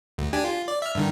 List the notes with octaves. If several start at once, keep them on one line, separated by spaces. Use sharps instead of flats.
D2
D4 G4 G#5
F4
D5
E5 F6
G2 D3 D#3